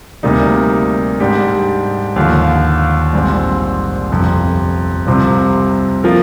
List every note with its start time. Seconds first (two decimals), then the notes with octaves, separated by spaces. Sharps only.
0.23 D2 C3 G3 A#3 D#4
1.20 G#2 G3 D4 G4
2.16 D#2 D3 F3
3.13 A#1 G#2 G3 C4
4.11 G1 F2 C3
5.07 C2 C3 F3 C4
6.04 F3 A#3 F4 A#4